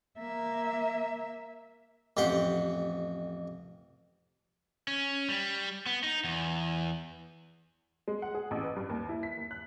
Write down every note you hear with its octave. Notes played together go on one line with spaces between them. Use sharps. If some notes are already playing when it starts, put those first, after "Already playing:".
A#3 E5
A1 F2 G4 C5 F#5
C#4
G3
B3
D#4
E2
G#3
F#5
G#4
A1
B4
G2
D#2
E4
B6
D#2
F#6